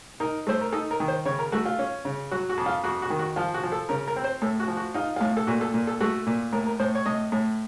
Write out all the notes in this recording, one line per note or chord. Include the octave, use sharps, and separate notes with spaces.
D#4 A#4
A3 C5
A#4
D#4 A4
A#4
D#3
C5
C#3 C#5
A#4
A3 F#4
F4
C#4
C#3
F#3 F#4
F#4
F2
F4
F2 F#4
F#4
D#3
F#4
F3 F4
F#4
F3
A4
C#3 A#4
A#4
C4
C5
A2 A4
F#4
F3
F#4
D#4 F4
A2 F4
A4
A#2 F#4
A4
A#2
A4
A3 F#4
A#2
A2 A#4
A#4
A2 C5
C#5
A2 D#5
A2